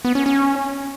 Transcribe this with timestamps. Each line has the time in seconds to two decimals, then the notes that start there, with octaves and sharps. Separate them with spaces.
0.05 B3
0.15 C#4
0.26 C#4